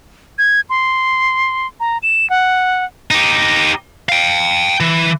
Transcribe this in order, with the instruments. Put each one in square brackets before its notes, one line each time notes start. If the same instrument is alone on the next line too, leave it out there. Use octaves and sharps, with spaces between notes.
[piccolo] G#6
C6
A#5
E7
F#5
[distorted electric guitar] D#4 G4
F5 G5
E3